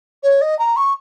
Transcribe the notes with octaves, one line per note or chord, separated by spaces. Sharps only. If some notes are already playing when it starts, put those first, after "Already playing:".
C#5
D#5
A#5
C#6